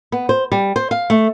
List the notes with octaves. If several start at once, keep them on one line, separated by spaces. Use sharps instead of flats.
B3
C5
G3
C5
F5
A3